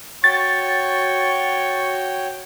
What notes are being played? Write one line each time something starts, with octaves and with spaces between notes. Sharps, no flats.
F#4 C#5 G5 C#6 A6